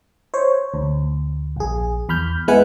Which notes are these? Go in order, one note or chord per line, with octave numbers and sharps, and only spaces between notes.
C5 C#5
D2
A#1 G#4
E2 B5 F6 G6
G#3 B3 E4 B4 F#5 G#5